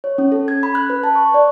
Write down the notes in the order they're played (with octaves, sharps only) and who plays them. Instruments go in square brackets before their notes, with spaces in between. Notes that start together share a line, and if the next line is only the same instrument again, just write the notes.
[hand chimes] C#5
C#4
A4
G#6
B5
F#6
B4
A5
C#6
D5